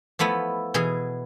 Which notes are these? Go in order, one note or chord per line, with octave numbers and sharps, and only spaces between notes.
F3 A3 B3 E4
B2 E3 G#4